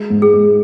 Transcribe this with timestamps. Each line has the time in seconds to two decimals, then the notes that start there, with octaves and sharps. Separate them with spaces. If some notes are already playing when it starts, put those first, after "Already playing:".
Already playing: G#3
0.10 G#2
0.22 G#4
0.34 G#2